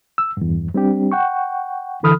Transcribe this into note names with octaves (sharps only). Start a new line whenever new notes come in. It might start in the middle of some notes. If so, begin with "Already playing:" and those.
E6
E2 G2
G3 C4 D4 G4
F#5 G5 C#6
D3 E3 A4 B5 D#6 F6